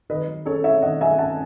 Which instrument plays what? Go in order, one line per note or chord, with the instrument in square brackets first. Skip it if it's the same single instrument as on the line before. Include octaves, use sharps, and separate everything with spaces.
[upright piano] D#3 B4 D#5
F#3
C#4 A4 C#5
E4 C#5 E5
D#3 D#5 F#5
F#3 E5 G#5
C#4 F#5 A5